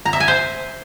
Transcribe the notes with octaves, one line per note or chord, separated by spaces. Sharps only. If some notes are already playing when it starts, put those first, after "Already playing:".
A#5
E5
G#5
C5